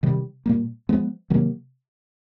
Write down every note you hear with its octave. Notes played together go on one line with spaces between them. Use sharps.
C3 D#3 G3
A#2 G3 A#3
F3 G#3 B3
C3 D#3 F#3 A#3